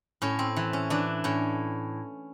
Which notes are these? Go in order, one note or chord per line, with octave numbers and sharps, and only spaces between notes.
A2 C#4
C4
E3
C#4
E3 D4
A2 C#4